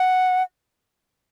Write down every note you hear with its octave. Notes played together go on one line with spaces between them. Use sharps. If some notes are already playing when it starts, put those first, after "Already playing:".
Already playing: F#5